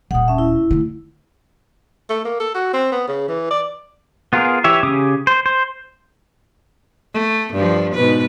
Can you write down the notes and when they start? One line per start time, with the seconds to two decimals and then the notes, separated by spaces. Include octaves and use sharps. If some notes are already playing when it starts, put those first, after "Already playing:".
0.11 D#1 A#2 F#5 D#6
0.27 C#4 E5 A5
0.38 E4
0.71 D3 A3
2.09 A3
2.25 A#3
2.40 A4
2.54 F#4
2.73 C4
2.92 B3
3.08 C#3
3.28 E3
3.50 D5
4.33 B3 F4 G#4 A#4
4.64 E3 E4 G4 C#5 E5
4.83 C#3 C#4 G4 D6 D#6
5.27 C5
5.46 C5
7.14 A3
7.54 G2 F3
7.94 G#2 B2 B4